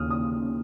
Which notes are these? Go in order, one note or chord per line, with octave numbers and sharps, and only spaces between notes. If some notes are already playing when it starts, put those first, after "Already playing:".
Already playing: D#2 C#3 D#6 F6
D#6